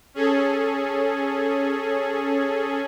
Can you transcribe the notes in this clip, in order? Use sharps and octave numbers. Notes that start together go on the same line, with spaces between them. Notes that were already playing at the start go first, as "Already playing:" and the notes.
C#4 G#4 A4